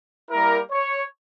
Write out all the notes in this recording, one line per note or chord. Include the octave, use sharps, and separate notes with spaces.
G3 A#3 E4 A#4
C#5